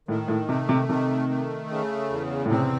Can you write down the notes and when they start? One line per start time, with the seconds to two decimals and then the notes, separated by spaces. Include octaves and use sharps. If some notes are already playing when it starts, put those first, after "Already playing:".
0.08 A2 D#3
0.28 A2
0.49 C3 A3
0.69 C3
0.89 C3 D#3
1.29 A3
1.71 C#3
2.10 E2
2.45 A2
2.51 C3 C4